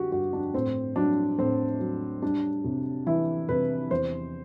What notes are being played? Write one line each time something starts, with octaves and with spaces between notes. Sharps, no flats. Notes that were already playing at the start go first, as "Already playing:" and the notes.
Already playing: D3 F#4 G4
G2 F#4
D4
A2 C4
F#3 D4
A2 C4
F#3
G3 D4
C3
E3 E4
C3 B4
E2 C5